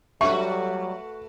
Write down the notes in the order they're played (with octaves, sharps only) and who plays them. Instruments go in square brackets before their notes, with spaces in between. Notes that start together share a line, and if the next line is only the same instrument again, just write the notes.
[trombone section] F#3 G3 [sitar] A3 F#4 B4 [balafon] E5 [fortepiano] C#6